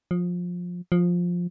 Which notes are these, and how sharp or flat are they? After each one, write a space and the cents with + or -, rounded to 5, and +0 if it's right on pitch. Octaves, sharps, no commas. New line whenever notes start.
F3 +20
F3 +10